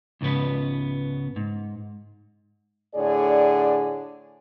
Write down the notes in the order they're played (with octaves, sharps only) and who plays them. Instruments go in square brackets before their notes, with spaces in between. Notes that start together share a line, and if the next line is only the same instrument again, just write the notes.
[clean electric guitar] C#2 G#2 C#3 B3 B4
G#2
[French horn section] A2 D3 G#4 C#5 D5